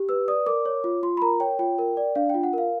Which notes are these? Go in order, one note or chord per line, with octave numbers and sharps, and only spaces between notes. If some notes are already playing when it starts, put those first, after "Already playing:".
Already playing: G4
B4 E6
D5 D#6
A#4 D6
C#5
F4
F4 C6
B5
A#4 A#5
C#5 G5
F4 G5
A#4
D5
D4 F5
F4 G5
F#5
A#4 F5